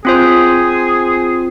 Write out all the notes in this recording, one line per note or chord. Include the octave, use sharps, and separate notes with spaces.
C4 F4 G#4 C5